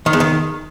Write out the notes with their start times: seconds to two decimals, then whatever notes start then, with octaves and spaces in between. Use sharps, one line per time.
0.06 D#3
0.13 E2
0.20 D#3